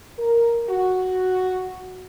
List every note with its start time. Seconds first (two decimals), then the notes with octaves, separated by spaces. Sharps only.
0.18 A#4
0.70 F#4